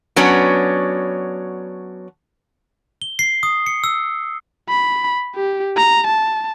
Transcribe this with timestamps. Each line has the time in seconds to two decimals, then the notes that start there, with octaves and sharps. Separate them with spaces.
0.16 F#3 B3 C#4 D4
3.02 G7
3.19 C7
3.43 D#6
3.67 C#7
3.84 E6
4.69 B5
5.35 G4
5.77 A#5
6.07 A5